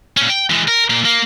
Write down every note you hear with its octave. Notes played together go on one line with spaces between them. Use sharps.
A#2 C#4
G5
E3 G#3
A#4
A#2 A#3
A#3